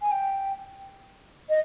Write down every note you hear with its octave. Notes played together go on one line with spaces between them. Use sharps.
G#5
G5
D#5